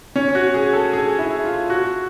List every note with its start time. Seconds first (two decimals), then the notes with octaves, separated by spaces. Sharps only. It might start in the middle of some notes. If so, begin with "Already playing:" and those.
0.16 C#4
0.35 F#4
0.54 G#4
0.73 A4
0.93 G#4
1.19 E4
1.45 F4
1.70 F#4